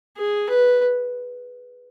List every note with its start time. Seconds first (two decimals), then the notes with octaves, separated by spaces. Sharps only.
0.17 G#4
0.49 B4